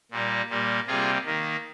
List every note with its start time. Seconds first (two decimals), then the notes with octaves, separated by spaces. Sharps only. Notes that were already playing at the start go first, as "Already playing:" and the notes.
0.11 A#2 G3 A#3
0.50 A#2 G3 A#3
0.87 C3 G3 A#3 F4 G#4
1.25 D#3 A#3